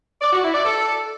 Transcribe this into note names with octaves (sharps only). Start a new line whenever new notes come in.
D5
F#4
E4
D5
A4